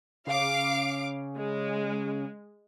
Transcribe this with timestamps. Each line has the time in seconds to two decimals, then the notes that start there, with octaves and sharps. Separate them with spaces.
0.27 C#3 F5 D6
1.36 G#3